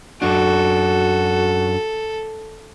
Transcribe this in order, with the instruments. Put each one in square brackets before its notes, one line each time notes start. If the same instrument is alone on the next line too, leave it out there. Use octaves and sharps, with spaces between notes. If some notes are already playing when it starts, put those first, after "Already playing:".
[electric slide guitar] F#2 D4 [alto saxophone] F#4 [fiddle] A4